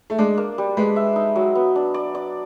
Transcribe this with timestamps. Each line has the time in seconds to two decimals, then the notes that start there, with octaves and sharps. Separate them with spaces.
0.10 A3
0.18 G#3 D4
0.38 A#3
0.58 G3
0.77 G#3 B4
0.96 E5
1.16 D#4
1.36 F#3
1.55 B3
1.76 D4
1.94 D5
2.15 D5